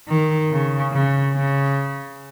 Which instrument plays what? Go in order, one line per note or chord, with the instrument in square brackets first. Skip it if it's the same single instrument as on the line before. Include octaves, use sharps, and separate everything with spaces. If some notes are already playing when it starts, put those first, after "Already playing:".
[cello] D#3
C#3
C#3
C#3